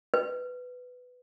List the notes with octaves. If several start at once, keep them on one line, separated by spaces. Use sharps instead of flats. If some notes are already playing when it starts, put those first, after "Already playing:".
B4